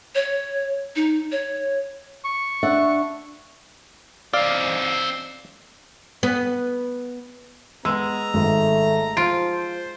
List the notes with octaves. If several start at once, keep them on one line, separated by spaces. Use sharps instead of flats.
C#5
D#4
C#5
C#6
D4 E5 F#5
C4 D#4 D5 F5
B3
G#3 B3 A#5 E6
G#1 A3
F3 F4 D7
C5